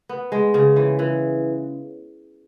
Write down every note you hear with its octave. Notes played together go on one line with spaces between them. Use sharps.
B3
G#3
C#3
E3
E3